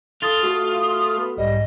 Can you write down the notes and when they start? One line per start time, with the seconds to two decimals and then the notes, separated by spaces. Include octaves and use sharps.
0.23 F4 A4 D#6 A6
0.43 A3 F#4 A4
1.18 B3
1.37 B1 G#2 G3 D#5